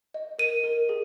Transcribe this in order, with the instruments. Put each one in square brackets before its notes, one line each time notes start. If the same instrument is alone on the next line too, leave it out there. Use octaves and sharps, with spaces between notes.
[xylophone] D#5
A#4 D#7
A#4
G#4